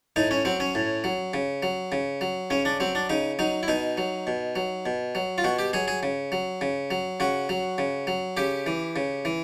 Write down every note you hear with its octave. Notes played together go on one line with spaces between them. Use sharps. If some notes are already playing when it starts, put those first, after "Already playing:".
A2 D#4
C#4
F#3 C4
C#4
A2
F#3
C#3
F#3
C#3
F#3
C#3 C#4
D4
F#3 C4
D4
C#3 D#4
F#3 D#4
E4
B2 D#4
F#3
B2
F#3
B2
F#3
F4
B2 F#4
G4
F#3 G#4
G#4
C#3
F#3
C#3
F#3
C#3 F#4
F#3
C#3
F#3
C#3 G4
E3
C#3
E3